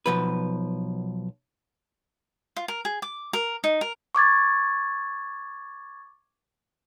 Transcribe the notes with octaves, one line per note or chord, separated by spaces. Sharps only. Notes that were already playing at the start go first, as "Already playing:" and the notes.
B1 F3 B4
F4
A#4
G#4
D6
A#4
D#4
A#4
C#6 D6 G#6 A6